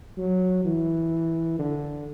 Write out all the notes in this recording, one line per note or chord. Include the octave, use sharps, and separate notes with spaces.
F#3
E3
D3